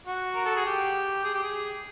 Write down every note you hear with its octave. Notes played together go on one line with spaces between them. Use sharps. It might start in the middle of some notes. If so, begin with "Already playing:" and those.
F#4
A#4
A4
G#4
G4
G#4
G4
G#4